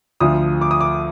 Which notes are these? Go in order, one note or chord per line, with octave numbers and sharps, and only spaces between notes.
D2 D3 F3 D#6
D6
D#6
D6